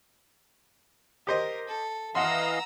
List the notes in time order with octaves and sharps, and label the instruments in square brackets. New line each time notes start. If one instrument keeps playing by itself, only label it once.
[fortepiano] G4 C5 D#5 [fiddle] A#4
[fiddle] A4
[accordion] E3 D#5 F5 [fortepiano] F#5 C6 [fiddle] A#5 E6